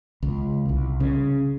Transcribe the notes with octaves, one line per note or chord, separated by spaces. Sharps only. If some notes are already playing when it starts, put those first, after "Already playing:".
C#2
C2
C#3